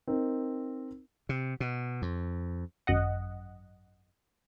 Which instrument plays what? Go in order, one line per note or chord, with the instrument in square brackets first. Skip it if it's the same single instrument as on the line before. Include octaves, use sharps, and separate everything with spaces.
[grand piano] C4 D#4 A#4
[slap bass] C3
B2
F2
[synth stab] G#1 F#2 D#5 F#5